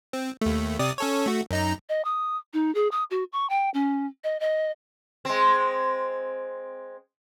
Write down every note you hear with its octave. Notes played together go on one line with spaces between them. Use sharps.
C4
D#2 A3
C3 D5 D#6
C#4 A4 C#5
A3 F#4
F#2 D#4 A#5
D#5
D#6
D#4
G#4
D#6
F#4
C#6
G5
C#4
D#5
D#5
G#3 C4